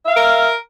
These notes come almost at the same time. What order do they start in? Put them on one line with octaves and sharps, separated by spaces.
E5 F5 A#4